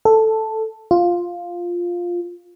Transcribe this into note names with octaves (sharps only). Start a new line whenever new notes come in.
A4
F4